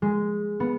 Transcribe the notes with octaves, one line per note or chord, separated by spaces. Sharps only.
G#3
B3